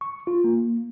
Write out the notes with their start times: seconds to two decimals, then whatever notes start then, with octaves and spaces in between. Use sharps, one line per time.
0.01 C#6
0.27 F4
0.44 A#3